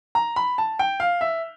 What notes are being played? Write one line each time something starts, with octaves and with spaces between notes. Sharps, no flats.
A#5
B5
A5
G5
F5
E5